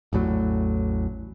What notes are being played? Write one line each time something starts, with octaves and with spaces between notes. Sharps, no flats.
A1 E2 A2 F#3